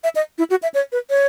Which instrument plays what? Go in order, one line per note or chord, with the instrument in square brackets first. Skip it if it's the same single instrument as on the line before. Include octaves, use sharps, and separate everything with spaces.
[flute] E5
D#5
E4
F#4
E5
C#5
B4
C#5